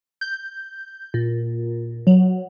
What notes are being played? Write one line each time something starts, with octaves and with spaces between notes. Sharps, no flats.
G6
A#2
F#3